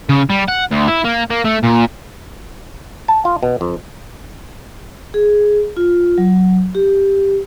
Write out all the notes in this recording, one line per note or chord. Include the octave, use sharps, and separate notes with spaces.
C#3
G3
F#5
D2
E4
A#3
A#3
A3
A#2
A5
F4
B2
F2
G#4
F4
F#3
G4